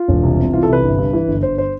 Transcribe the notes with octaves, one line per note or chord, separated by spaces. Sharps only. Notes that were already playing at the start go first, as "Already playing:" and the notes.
Already playing: F4
E1
C2
C3
E3 F4
A4
C2 B4
G1
G2
E3
G1
G1 C5
C5